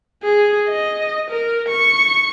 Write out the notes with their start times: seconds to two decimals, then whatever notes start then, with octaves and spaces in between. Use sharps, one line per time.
0.23 G#4
0.69 D#5
1.31 A#4
1.69 C#6